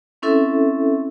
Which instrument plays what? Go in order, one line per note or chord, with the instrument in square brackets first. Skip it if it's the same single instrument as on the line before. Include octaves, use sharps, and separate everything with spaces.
[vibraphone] C4 C#4 E4 A4 E5